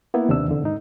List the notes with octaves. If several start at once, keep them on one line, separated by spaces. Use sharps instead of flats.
A#3 B3 E4
D#2 C3 D#3 D4 E6
E2 D3
G#2 D#4